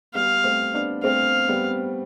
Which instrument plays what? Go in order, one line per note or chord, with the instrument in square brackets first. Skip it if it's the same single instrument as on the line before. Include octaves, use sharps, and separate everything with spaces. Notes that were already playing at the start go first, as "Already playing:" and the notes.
[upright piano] G3 B3 [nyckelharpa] F5
[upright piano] A3 C4
B3 D4
[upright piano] A3 C4 [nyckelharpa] F5
[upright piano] G3 B3